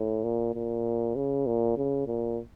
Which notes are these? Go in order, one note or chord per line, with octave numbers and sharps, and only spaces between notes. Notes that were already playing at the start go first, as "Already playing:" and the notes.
Already playing: A2
A#2
A#2
C#3
A#2
C#3
A#2